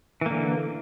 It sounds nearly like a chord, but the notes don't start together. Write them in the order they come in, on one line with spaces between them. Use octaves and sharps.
E3 A#3 D3